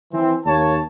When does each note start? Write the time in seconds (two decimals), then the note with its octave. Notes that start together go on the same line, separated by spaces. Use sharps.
0.13 E3 C4
0.46 D#2 A#3 C#5 A5